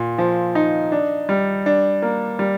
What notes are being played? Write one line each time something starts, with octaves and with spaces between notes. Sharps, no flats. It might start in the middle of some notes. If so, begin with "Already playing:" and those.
Already playing: A#2
F3
D#4
D4
G3
D4
A#3
G3